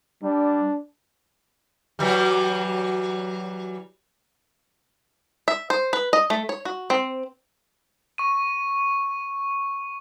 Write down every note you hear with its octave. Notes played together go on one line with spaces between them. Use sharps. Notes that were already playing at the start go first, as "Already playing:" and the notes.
G3 D4
E3 F#3 G3
E5
C5
B4
D#5
A3
C#5
F#4
C4
C#6 D#7